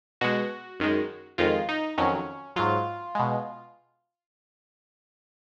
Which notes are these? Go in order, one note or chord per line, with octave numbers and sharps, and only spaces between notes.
B2 G#3 F#4
F#2 D#3 G#3
F2 D#3 G#3 F4
D#4
F2 D#3 F#3 C#4
G#2 F#3 F4
B2 G#3